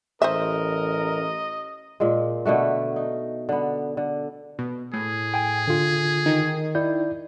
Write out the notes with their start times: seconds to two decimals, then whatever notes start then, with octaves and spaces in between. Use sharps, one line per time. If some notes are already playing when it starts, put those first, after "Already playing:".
0.22 A1 A#4 C5 D#5 E5
2.00 A#2 G#3
2.45 B2 D3 A3 F#4
2.96 D#4
3.49 D3 B3
3.97 D3
4.59 B2
4.93 A2 G#4
5.34 G5 G#5
5.68 D3 F4
6.26 D#3
6.75 E4 D5 G6